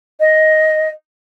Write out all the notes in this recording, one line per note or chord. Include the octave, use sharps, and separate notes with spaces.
D#5